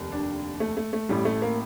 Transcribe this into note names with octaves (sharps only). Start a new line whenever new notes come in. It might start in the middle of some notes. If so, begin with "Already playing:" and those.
Already playing: F1 D#2
D4
A3
A3
A3
A1 A2 G3
A3
A#3